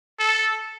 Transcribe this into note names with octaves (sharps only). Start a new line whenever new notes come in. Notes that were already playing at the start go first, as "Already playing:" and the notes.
A4